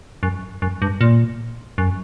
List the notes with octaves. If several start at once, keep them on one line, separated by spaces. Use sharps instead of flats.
F#2
F#2
G2
A#2
F#2